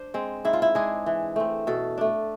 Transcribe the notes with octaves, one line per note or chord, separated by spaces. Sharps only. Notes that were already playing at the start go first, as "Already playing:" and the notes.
Already playing: D4 C5
G#3 C4
G#2 E4
F4
E4
G#3 D4 G#4
E3
A3 C4
B2 A4
A3 D4